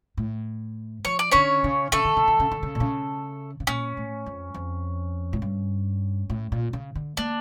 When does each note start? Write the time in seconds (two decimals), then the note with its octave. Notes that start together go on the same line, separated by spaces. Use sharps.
0.17 A2
1.05 F3 C#5
1.19 D5
1.32 D3 C#4 C#5
1.64 C#3
1.92 C#3 A3 A4
2.05 D3
2.17 C#3
2.28 D3
2.40 C#3
2.52 D3
2.63 C#3
2.75 A#2
2.80 C#3
3.60 C#3
3.67 A#2 C#4
3.97 A2
4.26 F2
4.54 F2
5.33 A2
5.42 G2
6.30 A2
6.52 A#2
6.73 C#3
6.95 D3
7.17 A#3 D4